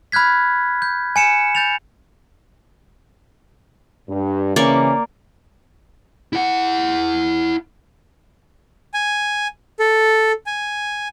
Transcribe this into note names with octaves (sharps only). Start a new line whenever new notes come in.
B5 F6 F#6 G#6 B6
G6
G#5 C#7 E7
G6 A6 F7
G2
C#3 E3 A#3 C#4 D5 C#6
E4 F#5
G#5
A4
G#5